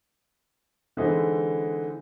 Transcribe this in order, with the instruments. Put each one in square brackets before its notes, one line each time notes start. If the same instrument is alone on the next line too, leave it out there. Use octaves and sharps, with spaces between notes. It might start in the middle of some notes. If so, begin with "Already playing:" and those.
[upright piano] D3 E3 G#3 C4 D#4